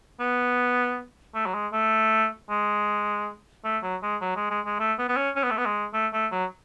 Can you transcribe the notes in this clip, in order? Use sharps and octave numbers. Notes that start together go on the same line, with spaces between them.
B3
A3
F#3
G#3
A3
G#3
A3
F#3
G#3
F#3
G#3
G#3
G#3
A3
B3
B3
C#4
C#4
B3
A3
B3
G#3
A3
A3
F#3